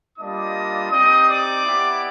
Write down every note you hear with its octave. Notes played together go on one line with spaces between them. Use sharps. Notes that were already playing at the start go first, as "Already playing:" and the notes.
G3 A#3 D4 F4 D#5 D#6
C4 D#4 G4 D#5 D#6
D5 D6
B3 E4 G4